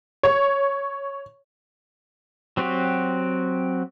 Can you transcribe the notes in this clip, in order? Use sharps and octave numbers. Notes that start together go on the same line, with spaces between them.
C#5
F#3 C4 F#4 G4